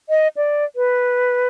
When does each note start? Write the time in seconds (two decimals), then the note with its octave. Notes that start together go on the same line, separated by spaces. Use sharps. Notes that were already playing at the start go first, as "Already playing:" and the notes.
0.09 D#5
0.37 D5
0.76 B4